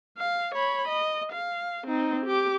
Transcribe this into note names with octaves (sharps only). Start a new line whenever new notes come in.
F5
C#5 B5
D#5
F5
C4 D#4
G4 D6